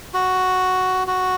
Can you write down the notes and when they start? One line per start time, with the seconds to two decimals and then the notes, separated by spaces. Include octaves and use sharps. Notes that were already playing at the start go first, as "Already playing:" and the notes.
0.14 F#4
1.07 F#4